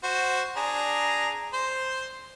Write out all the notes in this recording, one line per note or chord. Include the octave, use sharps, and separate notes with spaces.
F#4 C5
D4 G#4 A#5
C5 C6